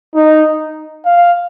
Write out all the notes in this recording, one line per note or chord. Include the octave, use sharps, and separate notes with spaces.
D#4
F5